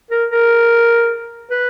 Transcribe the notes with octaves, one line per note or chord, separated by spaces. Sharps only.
A#4
A#4
B4